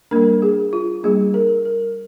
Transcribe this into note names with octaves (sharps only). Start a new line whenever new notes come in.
G3 A#3 D4 A#4
G#4
F4
G3 A#3 D4 G#4
A#4
A#4